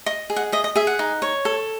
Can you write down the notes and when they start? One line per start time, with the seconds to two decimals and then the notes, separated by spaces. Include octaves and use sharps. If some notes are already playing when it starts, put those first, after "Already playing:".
0.06 D#5 D#6
0.30 G#4
0.36 F#5
0.52 D#5 E5
0.64 D#5
0.75 G#4 E5
0.87 F#5
0.99 D#4
1.22 C#5
1.45 A4